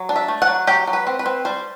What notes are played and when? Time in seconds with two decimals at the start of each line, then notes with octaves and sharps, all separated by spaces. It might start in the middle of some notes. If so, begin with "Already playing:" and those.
Already playing: F#3
0.09 D4
0.16 E5
0.28 A3
0.42 F#5
0.48 F#3
0.67 F#3 G4
0.87 F#3
0.93 B4
1.07 C4
1.19 B4
1.26 C4
1.45 G3 C5